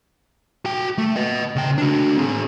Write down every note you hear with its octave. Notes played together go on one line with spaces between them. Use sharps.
F#4 G5
A3
B4 D#5
C#3 G5
D4 F#4
C4 G#4